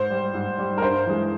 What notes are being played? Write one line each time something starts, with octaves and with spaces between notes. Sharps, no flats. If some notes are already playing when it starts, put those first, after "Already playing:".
Already playing: G#2 C5
G3
G#2
G3
A#4
G2 C5
E3 G#3